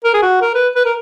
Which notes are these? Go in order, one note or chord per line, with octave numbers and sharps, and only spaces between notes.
A#4
G#4
F#4
A#4
B4
B4
A#4